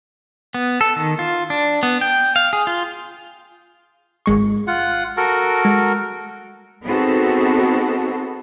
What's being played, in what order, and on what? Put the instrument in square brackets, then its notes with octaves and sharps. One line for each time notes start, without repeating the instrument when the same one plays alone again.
[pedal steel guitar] B3
A4
D#3
F4
D4
B3
G5
F5
G#4
F4
[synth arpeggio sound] G#1 G#3 C#6
[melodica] F4 F#5
F#4 A4 A#4
[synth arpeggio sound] G#3
[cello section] B3 C4 D#4 F#4 G#4 A4